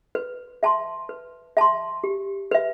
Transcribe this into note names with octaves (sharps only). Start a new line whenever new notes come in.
B4
E5 A5 C6
B4
E5 A5 C6
G4
B4 E5